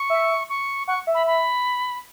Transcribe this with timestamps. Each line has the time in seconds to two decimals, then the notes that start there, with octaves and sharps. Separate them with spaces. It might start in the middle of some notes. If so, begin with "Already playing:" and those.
Already playing: C#6
0.10 E5
0.49 C#6
0.87 F#5 C#6
1.07 E5
1.15 B5
1.27 B5